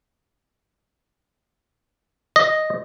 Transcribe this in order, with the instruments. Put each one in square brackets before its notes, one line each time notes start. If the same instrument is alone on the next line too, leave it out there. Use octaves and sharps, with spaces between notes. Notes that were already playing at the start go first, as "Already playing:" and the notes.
[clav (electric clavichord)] D#5